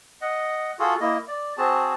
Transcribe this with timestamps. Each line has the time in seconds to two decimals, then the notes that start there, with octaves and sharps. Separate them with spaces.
0.21 D#5 F#5
0.79 F4 F#4 G#4 A4
1.01 A#3 E4 D#5
1.28 D5
1.57 C4 F#4 G#4 A5